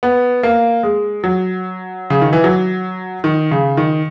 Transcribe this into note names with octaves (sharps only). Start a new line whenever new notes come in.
B3
A#3
G#3
F#3
C#3
D#3
E3
F#3
D#3
C#3
D#3